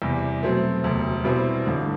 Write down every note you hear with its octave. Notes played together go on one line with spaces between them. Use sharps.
E2 C3 G3
B2 F#3 A3 C4
E1 D2 C3
B2 G3 C4 E4
A1 G2 D3